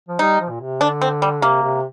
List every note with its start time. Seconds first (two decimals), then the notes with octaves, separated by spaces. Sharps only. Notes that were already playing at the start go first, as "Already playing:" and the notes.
0.09 F3
0.19 G3 D#4
0.40 F3
0.50 A#2
0.60 C3
0.81 D3 D4
1.01 C4
1.22 G3
1.42 C3 A#3
1.62 C3